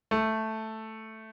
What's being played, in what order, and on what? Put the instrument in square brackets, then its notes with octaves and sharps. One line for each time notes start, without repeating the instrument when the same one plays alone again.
[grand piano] A3